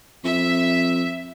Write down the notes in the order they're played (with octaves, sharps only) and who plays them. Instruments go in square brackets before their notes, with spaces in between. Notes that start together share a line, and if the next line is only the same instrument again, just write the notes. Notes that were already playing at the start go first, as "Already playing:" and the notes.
[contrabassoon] F2 [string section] E5